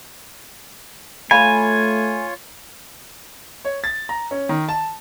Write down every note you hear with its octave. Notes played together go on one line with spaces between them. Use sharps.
A3 F4 C#5 F5 G#5 B5
C#5
A6
A#5
C#4
D#3
A5